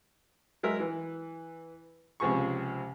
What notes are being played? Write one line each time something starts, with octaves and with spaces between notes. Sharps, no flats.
F#3 G#3 A#4 E5
E3
C#2 C3 F3 G#4 C#6